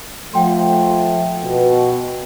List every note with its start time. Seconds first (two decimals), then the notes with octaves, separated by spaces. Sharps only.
0.34 F3 A3 F#5 G5 C6
1.43 B2